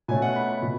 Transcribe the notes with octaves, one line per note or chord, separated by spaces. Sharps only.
B2 A3 C#4 G#5
F#5
B5
B5
B2